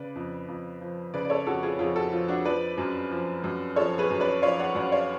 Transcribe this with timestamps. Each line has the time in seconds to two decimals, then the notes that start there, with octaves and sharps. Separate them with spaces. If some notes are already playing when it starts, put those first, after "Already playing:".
Already playing: C#3 B4 D5
0.16 F2
0.48 F2
0.81 F3
1.14 C#3 B4 D5
1.25 D5
1.30 A4 C#5
1.47 F2 F#4 A4
1.63 F4 G#4
1.79 F2 F4 G#4
1.95 F#4 A4
2.12 F3 F4
2.28 D4 F#4
2.45 F3 B4 D5
2.78 F#2
3.11 F3
3.44 F#2
3.76 F3 A4 C#5
3.98 G#4 B4
4.10 F#2
4.20 B4 D5
4.42 F3 C#5 F5
4.59 D5 F#5
4.75 F#2 D5 F#5
4.92 C#5 F5